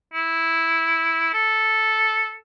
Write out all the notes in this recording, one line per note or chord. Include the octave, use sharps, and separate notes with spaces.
E4
A4